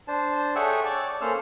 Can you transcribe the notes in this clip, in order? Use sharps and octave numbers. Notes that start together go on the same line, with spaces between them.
D4 C5 A5
G#4 A4 C#5 E5 F#5 G5
C#5 D5 A5
A#3 C#4 A4 C5 E6 F6